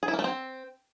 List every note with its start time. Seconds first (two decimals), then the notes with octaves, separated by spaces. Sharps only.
0.03 G#4
0.08 E4
0.13 A#3
0.19 A3
0.24 C4